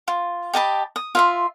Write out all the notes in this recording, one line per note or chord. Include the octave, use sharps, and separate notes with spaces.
F4
G4 D#5 A5 B5
D#6
F4 E5 C6